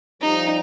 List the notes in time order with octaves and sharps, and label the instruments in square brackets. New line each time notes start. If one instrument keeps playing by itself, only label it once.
[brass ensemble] F3 G3 [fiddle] D#4